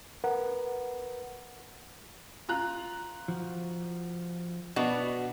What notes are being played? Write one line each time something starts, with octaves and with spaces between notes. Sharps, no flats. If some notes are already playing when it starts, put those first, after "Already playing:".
A#4 B4 F#5
F4 A#5 F#6
F3 F#4
B2 B3 D4 F#4